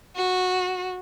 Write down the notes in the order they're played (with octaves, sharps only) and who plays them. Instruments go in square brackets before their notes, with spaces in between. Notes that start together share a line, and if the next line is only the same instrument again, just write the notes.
[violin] F#4